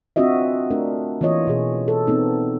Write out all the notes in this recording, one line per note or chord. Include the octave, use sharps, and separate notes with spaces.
C4 D4 F4 F#4 D#5 E5
A3 D4 A#4
E3 A#3 F4 C#5 D#5
B2 E3 G#4
A4
B3 C4 D#4